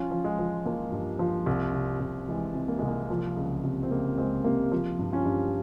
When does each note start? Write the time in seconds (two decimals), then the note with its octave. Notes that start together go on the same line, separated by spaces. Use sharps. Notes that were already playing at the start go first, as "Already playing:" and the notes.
Already playing: F3 C#4 F4
0.11 F3
0.24 G#3
0.39 F3
0.65 F3 A#3
0.92 G2
1.19 F3
1.46 C2
1.74 C3
2.01 C2
2.28 E3 G#3
2.55 C3
2.68 A#3
2.79 C2 G#3
2.88 A#3
3.10 F3
3.37 C#2
3.64 C3
3.83 C4
3.91 C#2 A#3
4.18 C#2 G#3 C4
4.44 C3 A#3
4.72 F3
4.99 G2
5.12 C#4 F4
5.26 G2